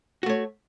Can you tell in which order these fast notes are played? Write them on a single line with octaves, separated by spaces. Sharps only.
F#4 A3 C#5